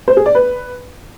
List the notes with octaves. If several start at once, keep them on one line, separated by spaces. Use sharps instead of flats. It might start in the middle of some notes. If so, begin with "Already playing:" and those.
C5
G#4
D5
B4